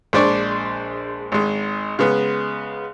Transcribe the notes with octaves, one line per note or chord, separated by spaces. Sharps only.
A#1 G#3 D4 C5 D5 C#6
G#1 G#3
C#3 G#3 B3